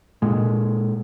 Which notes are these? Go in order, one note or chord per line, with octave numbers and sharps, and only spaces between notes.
A#2 G#3